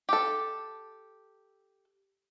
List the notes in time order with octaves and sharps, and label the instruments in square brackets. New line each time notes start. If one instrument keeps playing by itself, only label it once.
[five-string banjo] G4 A4